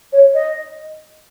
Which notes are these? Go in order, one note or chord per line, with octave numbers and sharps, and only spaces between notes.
C#5
D#5